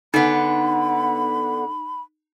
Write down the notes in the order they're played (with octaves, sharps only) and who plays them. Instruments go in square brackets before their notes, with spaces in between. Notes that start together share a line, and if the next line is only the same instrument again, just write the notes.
[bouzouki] D3 B3 [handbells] D#4 [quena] B5